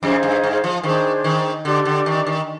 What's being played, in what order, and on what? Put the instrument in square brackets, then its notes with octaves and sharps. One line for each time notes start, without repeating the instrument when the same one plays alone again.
[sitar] F2 [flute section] D#4 G#4 C5 F5
[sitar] G2
G#2
F3
[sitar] D#3 [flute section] D4 G#4 C5
[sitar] D#3
[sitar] D3 [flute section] D4 G4 D5
[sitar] D3
D#3
D#3